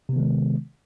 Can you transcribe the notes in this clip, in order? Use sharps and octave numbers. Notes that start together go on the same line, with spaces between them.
C3 D#3 G#3 B3